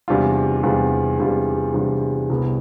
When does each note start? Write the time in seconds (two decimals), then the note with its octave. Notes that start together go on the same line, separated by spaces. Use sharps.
0.08 E2 C3 G3 D4 F4
0.63 E2 C3 G3 D4 F4
1.19 E2 C3 G3 D4 F4
1.74 E2 C3 G3 D4 F4
2.29 C2 C3 G3 B3